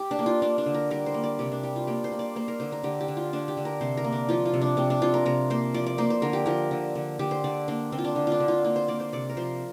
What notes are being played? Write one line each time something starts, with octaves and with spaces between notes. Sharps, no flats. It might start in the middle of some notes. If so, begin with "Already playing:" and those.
Already playing: G4
D4
A#3
F4
A#3 D4
D4
D3
A#4
G3 A#4
C5
A#3
D5
C3 G4
D4
G3 G4
F4
A#3 G4
C5
A#3
D5
A#3 C5
A#4
D3 C5
A#4
D3 G4
G4
D3
F4
D3 D4
G4
D3
A#4
C3 C5
A#4
A#3
D4
F3 F4
F4
C3
D4
C3 C4
D4
C3 F4
A#4
C3 A#4
A#3 C5
F3 D5
D5
A#3 C5
C5
D3 A#4
G4
F3 A#4
D3
D3
D3 G4
C5
D3 D5
A#3 D4
D3 C4
F4
D4
D3 F4
D4 F4
D3
F4
A#3 F4
C5
A#3 D5
C5
C3 D5
A#4
F3 C5